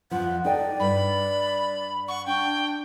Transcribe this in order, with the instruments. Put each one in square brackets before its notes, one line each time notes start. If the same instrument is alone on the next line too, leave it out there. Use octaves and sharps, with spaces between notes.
[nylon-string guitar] F2 F3 [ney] F#5
[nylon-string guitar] D#4 A4 G5 [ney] D5
[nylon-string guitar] G2 [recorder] B5
[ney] F#5 [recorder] C#6
[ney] D4 [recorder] G5